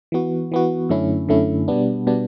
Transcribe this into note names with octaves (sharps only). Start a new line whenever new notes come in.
E3 B3 F#4
E3 B3 F#4
F#2 D3 A3 C#4 E4
F#2 D3 A3 C#4 E4
B2 G3 B3 D4
B2 G3 B3 D4